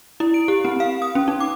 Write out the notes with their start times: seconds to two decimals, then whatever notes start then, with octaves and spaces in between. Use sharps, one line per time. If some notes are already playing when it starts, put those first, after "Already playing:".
0.20 E4
0.34 D7
0.48 G4
0.65 C4
0.80 F5
1.02 D#6
1.15 C#4
1.28 D#4
1.40 D6